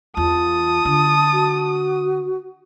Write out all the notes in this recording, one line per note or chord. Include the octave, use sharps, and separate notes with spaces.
E2 F4 A5 D#6
D3
F#4